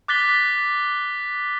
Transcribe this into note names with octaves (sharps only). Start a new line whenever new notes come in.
D6 F#6 A6 B6 G7